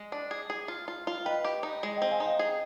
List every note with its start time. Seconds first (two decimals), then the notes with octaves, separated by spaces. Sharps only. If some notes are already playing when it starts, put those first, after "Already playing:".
Already playing: G#3
0.12 D4
0.31 G#4
0.50 G#4
0.68 F4
0.88 F4
1.07 F4
1.25 B4 D#5 G5
1.44 G4
1.63 D#4
1.83 G#3
1.96 D#5 G5
2.02 C4
2.11 F5 G#5
2.20 D#4
2.25 D#5 G5
2.39 G#4